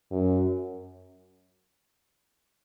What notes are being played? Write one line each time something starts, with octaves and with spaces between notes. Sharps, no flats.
F#2